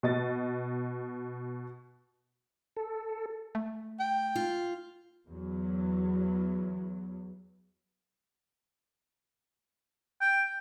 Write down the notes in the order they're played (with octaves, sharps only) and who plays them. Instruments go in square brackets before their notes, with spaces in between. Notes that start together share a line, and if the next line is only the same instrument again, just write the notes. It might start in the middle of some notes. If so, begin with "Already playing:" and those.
[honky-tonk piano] B2 D#5 A6
[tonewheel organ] A4
[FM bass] A3
[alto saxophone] G5
[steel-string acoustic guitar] F4
[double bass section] E2 F#3
[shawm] G5